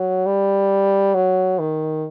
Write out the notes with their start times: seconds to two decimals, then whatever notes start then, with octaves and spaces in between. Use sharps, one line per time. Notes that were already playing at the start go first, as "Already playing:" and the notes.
Already playing: F#3
0.26 G3
1.14 F#3
1.59 D#3